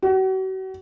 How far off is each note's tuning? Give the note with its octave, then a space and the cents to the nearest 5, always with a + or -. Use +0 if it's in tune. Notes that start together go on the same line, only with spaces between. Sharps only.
F#4 +40